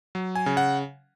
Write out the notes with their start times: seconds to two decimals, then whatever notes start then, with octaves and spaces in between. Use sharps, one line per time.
0.15 F#3
0.35 G#5
0.46 C#3
0.57 F#5